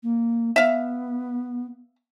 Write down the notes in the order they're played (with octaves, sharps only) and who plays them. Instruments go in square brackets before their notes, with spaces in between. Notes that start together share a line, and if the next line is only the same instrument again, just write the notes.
[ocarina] A#3
[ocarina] B3 [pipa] E5 F5